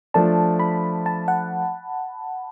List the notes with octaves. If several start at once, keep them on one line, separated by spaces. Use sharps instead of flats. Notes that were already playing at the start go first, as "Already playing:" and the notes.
F3 A3 D4 A5
B5
A5
F#5